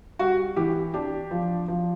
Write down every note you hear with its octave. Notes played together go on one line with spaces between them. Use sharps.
G3 F#4
E3 G4
D4 G4
F3
F3